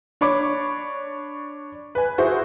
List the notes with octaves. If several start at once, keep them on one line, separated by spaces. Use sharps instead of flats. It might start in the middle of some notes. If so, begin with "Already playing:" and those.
D4 C#5 B5 D6
B4 G#5
E4 F#4 G#4 C5